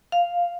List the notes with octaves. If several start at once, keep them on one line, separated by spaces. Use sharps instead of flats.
F5